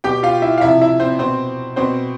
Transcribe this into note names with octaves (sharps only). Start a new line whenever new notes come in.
B2 G4 G5
F4 F5
E4 E5
F5
C3 F3 E4 E5
E4 E5
C4 C5
B2 C4 C5
B2 C4 C5